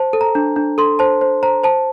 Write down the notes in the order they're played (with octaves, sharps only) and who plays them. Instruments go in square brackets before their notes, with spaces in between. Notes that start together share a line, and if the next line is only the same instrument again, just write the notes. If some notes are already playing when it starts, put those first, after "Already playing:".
Already playing: [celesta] C5 A5
A4
A#5
D4
D4
A4 C6
C5 A5
C5
C5 A#5
C5 A5